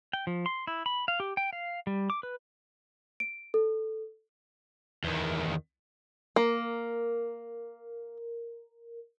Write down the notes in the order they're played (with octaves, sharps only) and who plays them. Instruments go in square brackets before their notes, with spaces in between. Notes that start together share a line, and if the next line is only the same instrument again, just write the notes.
[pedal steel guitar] G5
F3
C6
E4
B5
F5
G4
G5
F5
G3
D6
B4
[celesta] D7
A4
[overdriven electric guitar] E2 D#3
[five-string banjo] A#3 [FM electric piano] A#4